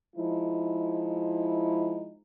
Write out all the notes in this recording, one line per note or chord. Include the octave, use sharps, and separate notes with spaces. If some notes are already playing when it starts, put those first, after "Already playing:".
F3 G#3 D#4 E4